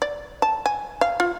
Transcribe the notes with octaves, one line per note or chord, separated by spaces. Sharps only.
D5
A5
G#5
F5
F4